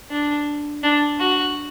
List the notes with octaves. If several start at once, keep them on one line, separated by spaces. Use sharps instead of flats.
D4
D4
F#4